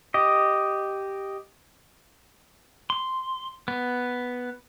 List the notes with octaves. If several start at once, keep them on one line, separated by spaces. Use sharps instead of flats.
G4 D#5
C6
B3